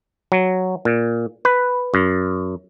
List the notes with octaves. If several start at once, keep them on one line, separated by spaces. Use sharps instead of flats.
F#3
A#2
B4
F#2